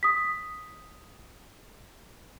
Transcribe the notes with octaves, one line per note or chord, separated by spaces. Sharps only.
D#6 B6